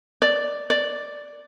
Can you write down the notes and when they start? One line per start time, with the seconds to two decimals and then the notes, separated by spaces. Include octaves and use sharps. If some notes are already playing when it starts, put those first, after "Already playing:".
0.22 D5
0.70 D5